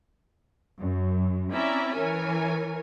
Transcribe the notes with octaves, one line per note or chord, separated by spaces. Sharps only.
F#2
C4 C#4 E4 D5 E5 A#5
E3 A#4 C#5 G#5